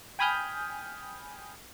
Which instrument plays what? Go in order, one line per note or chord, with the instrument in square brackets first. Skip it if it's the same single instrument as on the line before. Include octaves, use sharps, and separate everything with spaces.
[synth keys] G5 G#5 B5 D#6 F6 G6